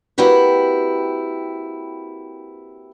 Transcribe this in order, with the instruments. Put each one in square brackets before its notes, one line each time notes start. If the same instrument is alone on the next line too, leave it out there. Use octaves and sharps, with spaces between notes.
[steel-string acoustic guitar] A#3 C4 E4 F#4 G4 B4